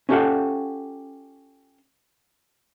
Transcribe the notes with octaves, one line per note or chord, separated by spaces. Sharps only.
C#4 F4 G4 A4 F5 F#5